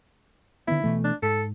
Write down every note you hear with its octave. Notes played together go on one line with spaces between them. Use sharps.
D3 D#3 B3 E4
B2 E3 A3
D4
G#2 A4